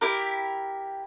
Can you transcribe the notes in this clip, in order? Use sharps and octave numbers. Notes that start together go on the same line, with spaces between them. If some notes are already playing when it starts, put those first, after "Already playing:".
E4 G4 A#4